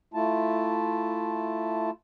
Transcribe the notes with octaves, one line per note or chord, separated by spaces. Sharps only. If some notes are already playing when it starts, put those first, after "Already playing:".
A3 E4 F4 A5